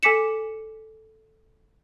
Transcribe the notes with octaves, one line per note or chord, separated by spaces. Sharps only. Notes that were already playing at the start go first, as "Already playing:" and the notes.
A4 G#5 D6 B6 C#7 E7